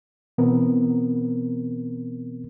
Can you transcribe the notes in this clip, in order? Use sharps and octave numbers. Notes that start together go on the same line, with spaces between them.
B2 E3 B3 C4 A#4